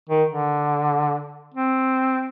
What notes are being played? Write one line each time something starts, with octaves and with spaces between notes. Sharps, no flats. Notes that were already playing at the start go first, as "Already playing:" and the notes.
D#3
D3
C4